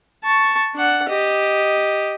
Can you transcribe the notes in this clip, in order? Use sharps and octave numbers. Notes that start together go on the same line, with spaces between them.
A5 C#6
D4 F#5
G4 D#5